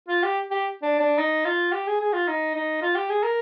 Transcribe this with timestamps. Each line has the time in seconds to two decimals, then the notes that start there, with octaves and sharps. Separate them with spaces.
0.08 F4
0.23 G4
0.51 G4
0.82 D4
1.00 D4
1.18 D#4
1.45 F4
1.72 G4
1.87 G#4
2.01 G#4
2.13 F4
2.28 D#4
2.54 D#4
2.82 F4
2.95 G4
3.10 G#4
3.23 A#4